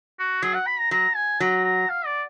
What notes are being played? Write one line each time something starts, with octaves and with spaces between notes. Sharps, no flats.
F#4
F#3 G#4
F#5
B5
A#5
F#3 A#5
G#5
F#3 A#5
A#5
F5
D5